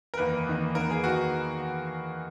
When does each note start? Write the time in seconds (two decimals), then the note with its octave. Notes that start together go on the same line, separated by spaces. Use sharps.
0.14 A#4
0.17 E2 D#3 A#3 B4
0.47 E2 D#3 A#3
0.75 E2 D#3 A#3 A#4
0.90 G#4
1.04 D#3 A#3 F#4